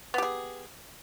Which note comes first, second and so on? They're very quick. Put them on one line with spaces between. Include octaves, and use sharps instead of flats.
B3 G4 G#4